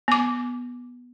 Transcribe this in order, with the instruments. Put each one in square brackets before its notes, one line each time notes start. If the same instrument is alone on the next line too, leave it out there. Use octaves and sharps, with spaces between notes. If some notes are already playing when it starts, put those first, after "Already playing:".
[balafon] B3 D6